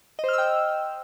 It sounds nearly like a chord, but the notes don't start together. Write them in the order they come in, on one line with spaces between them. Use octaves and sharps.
D#5 C5 F6 E6 G5